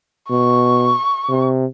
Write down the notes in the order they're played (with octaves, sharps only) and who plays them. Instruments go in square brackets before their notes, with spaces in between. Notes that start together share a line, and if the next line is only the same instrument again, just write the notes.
[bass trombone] B2 [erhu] C#6
[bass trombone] C3